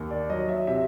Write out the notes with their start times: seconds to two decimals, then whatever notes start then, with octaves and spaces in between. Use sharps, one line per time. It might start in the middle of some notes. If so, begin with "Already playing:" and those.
Already playing: D#2
0.11 D5
0.30 F#3 D#5
0.49 E5
0.67 C3 E5